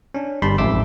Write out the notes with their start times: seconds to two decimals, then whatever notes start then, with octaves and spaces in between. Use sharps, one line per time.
0.14 C#4 D4
0.42 G1 G2 G3 A5 B5 C6
0.58 A1 F2 G#2 E5 D6 E6